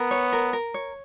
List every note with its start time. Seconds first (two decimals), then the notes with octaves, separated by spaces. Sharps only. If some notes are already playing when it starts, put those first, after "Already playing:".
Already playing: B3 A#4
0.11 C#5
0.32 A#4
0.53 A#4
0.74 C#5